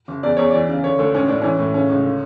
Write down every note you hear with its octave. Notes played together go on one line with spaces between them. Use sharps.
F#1
E2 D5
E2 C#5
E3 D5
C#3
D3 C#5
D2 A4
A1 C#4
A2 D4
E3 C#4
A2
C#3 C#4
C#2
D3